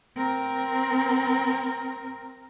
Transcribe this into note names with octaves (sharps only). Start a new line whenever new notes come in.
C4 A#4